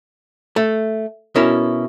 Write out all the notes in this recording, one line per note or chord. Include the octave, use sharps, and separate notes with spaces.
A3
B2 C#4 E4 A#4